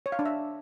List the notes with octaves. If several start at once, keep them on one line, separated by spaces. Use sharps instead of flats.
C#5
F5
D4
E5